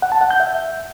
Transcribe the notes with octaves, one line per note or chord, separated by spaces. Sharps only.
F#5
A5
F#5
G6
E5